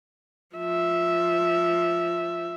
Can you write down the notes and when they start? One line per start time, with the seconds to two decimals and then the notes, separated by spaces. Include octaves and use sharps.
0.56 F3 E5